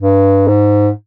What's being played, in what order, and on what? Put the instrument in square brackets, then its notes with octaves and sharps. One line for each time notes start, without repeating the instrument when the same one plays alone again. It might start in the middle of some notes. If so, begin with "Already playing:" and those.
[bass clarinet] G2
G#2